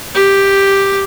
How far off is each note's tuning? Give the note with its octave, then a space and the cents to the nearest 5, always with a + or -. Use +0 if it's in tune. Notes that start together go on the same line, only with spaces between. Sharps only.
G4 +5